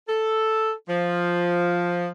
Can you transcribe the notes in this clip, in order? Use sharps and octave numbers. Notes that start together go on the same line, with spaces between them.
A4
F3